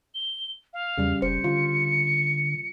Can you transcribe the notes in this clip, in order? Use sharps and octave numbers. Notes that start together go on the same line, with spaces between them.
G7
F5
E2 C#3 G3
F1 C5 C#7
D3 F4